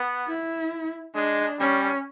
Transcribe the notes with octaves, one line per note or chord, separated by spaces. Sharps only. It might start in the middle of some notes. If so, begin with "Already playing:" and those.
Already playing: B3
E4
G#3 D4
G3 C#4